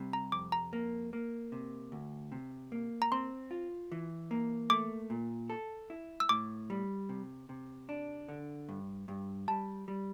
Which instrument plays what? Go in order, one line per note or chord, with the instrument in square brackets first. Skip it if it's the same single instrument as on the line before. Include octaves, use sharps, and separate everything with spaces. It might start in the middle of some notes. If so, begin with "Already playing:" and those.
Already playing: [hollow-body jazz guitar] C3 G3
[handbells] A#5
[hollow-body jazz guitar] F2 [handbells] D6
[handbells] A#5
[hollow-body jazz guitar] A#3
A#3
C3
D2
C3
A#3
[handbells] A#5
[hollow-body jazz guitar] C4 [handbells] C6
[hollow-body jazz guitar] F4
E3
A#3
[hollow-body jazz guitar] A3 [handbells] D6
[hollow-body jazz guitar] A#2
A4
E4
[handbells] E6
[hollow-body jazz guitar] A2 [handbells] D6
[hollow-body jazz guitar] G3
C3
C3
D4
D3
G2
G2
[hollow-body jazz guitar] G3 [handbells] A5
[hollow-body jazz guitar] G3